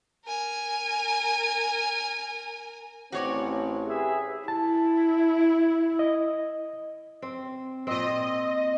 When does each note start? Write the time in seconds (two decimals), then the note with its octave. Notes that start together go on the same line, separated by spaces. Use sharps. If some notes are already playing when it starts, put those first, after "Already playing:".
0.26 A#4 G#5
3.12 A1 C4 F#4 C#5 D5
3.87 G4 G#4 B4 E5
4.48 E4 A5
5.99 D#5
7.22 C4
7.87 A#2 C4 D#5